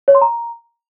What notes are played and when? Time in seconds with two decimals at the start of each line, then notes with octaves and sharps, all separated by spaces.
0.08 C#5
0.15 C6
0.21 A#5